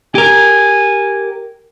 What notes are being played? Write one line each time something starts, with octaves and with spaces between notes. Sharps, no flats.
G4 A#4 G#5